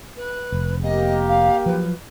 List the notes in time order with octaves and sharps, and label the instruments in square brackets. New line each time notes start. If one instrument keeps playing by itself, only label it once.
[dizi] B4
[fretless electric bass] F1
[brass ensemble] A#3 G4 [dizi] D#5
[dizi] F5
[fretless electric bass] F3 F#3 [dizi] B4